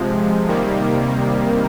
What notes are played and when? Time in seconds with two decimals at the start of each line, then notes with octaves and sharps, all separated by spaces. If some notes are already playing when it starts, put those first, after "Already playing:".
Already playing: C3 F3 G#3
0.48 C3 D#3 G3 A#3